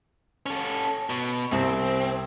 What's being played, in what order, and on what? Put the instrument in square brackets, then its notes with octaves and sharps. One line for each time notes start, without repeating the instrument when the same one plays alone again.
[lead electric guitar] C#4 A4
B2
[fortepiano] C2 [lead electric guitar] C4